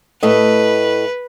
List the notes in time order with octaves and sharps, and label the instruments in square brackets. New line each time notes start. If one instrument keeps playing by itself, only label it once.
[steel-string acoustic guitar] A2 A3 D#5 [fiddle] B4